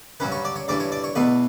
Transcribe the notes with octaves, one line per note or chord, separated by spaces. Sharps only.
G2 F#3 C#4 B4
C#5
D5
C#5
G2 E3 A3 D5
C#5
D5
C#5
E2 B2 A3 B4